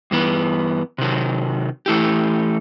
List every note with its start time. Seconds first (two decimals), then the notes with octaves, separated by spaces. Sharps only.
0.11 G2 E3 B3
0.98 C3 D#3 F#3
1.86 E3 A3 E4 G4